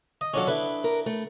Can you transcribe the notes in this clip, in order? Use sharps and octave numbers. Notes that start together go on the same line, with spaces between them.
D#5
F#3 C#4 D4 F4 A4 D#5
D4 E4 A4 B4
A#4
A3